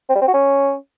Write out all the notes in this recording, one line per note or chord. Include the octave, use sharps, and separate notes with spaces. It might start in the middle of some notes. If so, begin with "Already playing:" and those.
C4
G3
C4
F#4
C#4